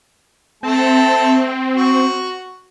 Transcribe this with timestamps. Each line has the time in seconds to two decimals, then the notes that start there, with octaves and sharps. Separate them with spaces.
0.63 A3 C4 A5
1.76 F#4